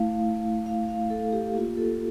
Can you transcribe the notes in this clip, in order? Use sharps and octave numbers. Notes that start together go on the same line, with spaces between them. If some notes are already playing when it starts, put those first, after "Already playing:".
Already playing: A3 E4 F5
F5
F5
F5
A4
G4
A#3 F4 G4
A4